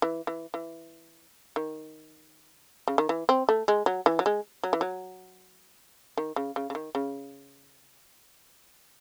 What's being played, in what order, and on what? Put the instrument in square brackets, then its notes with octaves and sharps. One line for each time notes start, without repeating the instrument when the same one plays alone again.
[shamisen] E3
E3
E3
D#3
C#3
D#3
E3
C4
A3
G#3
F#3
E3
F#3
G#3
F#3
E3
F#3
D#3
C#3
C#3
C#3
D#3
C#3